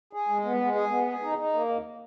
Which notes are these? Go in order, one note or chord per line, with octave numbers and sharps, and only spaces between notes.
G#4
G#3
B3
G#3
G#4
B3
G#4
D#4
D#4
A#3
D#2